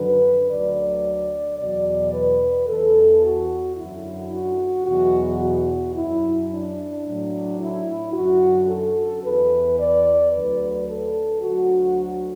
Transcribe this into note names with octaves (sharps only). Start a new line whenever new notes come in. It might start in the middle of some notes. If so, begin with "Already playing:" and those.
Already playing: F#2 D3 F#3 B4
D2 D3 F#3 D5
E2 B2 F#3 D5
B4
E2 E3 A4
F#4
F#2 D3 F#3 E4
F#4
E2 B2 F#3 F#4
F#4
F#2 F#3 E4
D4
A2 F#3
E4
F#2 D3 F#3 F#4
A4
E2 E3 B4
D5
D2 D3 F#3 B4
A4
D2 D3 F#3 F#4